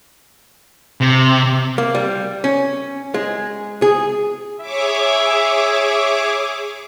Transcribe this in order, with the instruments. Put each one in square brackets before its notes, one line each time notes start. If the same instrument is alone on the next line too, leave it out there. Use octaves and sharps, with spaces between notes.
[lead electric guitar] C3
[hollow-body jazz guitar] A#3
G3
C#4
G#3
G#4
[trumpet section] E4 E5 [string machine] G#4 C#5 D6